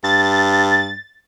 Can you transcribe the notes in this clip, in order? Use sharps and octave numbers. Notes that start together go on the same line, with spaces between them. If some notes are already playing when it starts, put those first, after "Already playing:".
G2 A6